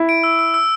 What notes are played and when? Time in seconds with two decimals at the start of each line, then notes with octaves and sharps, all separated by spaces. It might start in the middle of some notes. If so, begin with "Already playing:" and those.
Already playing: E4
0.09 D7
0.24 E6
0.39 E6
0.54 E6